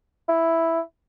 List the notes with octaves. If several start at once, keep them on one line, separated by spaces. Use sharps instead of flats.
E4